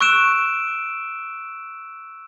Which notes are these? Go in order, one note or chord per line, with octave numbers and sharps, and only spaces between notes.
C#6 E6 F#6 D7 E7